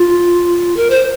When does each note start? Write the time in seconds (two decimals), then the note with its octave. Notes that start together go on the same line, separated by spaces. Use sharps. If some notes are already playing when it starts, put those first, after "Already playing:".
Already playing: F4
0.77 A#4
0.90 C5